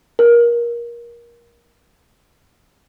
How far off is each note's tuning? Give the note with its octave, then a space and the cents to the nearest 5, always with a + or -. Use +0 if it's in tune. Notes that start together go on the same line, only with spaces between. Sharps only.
A#4 +20